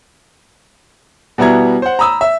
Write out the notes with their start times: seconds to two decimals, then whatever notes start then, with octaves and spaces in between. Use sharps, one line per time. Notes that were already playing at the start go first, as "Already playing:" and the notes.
1.38 B2 G3 B3 E4 A#5 G#6
1.82 C5 F#5
1.99 A#5 B5 D#6 E6
2.21 E5